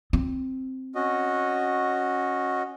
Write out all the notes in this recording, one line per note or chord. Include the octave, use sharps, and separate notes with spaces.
C4
C#4 F#4 D#5